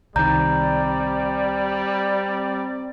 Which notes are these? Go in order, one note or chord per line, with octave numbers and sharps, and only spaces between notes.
C2 D#3 G3 C4 D5 A#5 G6